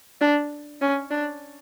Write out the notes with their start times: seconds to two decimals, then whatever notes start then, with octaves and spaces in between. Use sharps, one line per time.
0.21 D4
0.81 C#4
1.10 D4